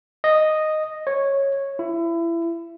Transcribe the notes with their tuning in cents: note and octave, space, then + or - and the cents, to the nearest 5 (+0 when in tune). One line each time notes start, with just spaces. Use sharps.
D#5 -5
C#5 -10
E4 +25